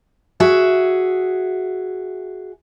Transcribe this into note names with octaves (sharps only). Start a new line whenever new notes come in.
F#4 G#4 E5